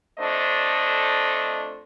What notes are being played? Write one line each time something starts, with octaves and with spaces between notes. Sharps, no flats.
F2 A3 D4 A4 C5 D#5